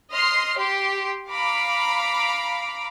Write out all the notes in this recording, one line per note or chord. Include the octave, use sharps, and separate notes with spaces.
D#5 C6 F6 C7
G4 C6
F5 A#5 B5 D6